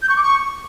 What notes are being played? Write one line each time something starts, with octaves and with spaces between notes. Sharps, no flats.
G6
C#6
D6
C#6